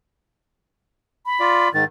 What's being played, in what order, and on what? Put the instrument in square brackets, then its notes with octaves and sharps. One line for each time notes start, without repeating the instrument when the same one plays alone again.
[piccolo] B5
[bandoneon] F4 D5
[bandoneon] G#2 D#3 [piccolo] A6